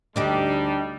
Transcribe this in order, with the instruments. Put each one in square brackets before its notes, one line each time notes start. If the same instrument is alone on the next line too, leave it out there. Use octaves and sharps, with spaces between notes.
[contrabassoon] D2 [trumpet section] G3 [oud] D4 D#4 G4 [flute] D#5